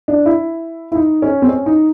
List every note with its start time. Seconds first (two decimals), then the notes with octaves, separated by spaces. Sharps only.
0.08 D4
0.26 E4
0.92 E4
0.95 D#4
1.22 C#4
1.42 C4
1.49 C#4
1.66 D#4